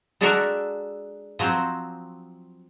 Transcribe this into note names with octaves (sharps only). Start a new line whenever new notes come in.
G#3 D4 F#4 A4 A#4 E5
F3 F#3 C4 C5